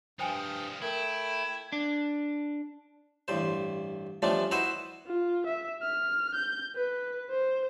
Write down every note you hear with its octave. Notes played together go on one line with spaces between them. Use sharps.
G2 F3 G3 C5 G5 G#5 D#6 F6
A3 E4 A#4 G5 B5 G#6
D4
A1 G2 C5
F3 G3 A3 C#4 D4
E4 F#4 B4 C5 D#5 E5
F4
E5
F6
G6
B4
C5